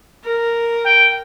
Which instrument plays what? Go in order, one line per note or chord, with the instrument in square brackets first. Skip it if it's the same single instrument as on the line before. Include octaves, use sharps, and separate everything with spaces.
[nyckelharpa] A#4
[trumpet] G5